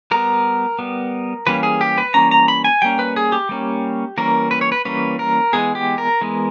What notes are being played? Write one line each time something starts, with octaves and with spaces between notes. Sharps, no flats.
G3 B3 A#4
G3 B3
E3 G3 A#3 C#4 B4
G#4
G4
B4
E3 G3 A#3 C#4 A#5
A#5
B5
G#5
G3 A#3 C#4 G5
B4
G#4
G4
G3 A#3 C#4
E3 G3 A#3 C#4 A#4
B4
C#5
B4
E3 G3 A#3 C#4 B4
A#4
E3 G#3 B3 G#4
G4
A#4
E3 G#3 B3